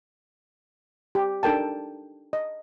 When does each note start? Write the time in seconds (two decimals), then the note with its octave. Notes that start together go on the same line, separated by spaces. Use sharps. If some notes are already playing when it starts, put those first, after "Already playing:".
1.15 G4
1.43 D4 D#4 A4 A#4 G5 A5
2.33 D#5